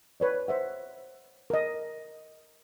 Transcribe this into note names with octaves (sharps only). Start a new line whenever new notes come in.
B4 C#5 D5
C5 E5 F#5
A#4 D#5